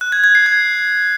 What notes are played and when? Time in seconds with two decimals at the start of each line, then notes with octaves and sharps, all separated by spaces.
0.01 F#6
0.12 G#6
0.24 G#6
0.35 C7
0.46 G#6